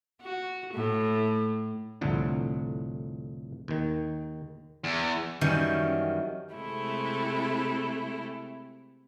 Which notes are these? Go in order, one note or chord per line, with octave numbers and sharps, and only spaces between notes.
F#4
A2
C2 F2 A2 D3
D#2 D#3
E2
F#2 D#3 E3 G3 C#4
C3 G#3 A3 E4